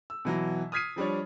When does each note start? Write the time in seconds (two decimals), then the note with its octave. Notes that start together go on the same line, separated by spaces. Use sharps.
0.10 E6
0.25 B2 E3 F#3
0.72 D#6 F6 G#6 B6 C7 D#7
0.96 F3 G3 D4 C#5